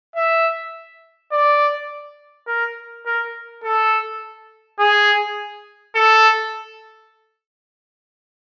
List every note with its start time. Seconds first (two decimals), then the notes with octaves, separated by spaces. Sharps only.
0.16 E5
1.32 D5
2.47 A#4
3.06 A#4
3.64 A4
4.79 G#4
5.95 A4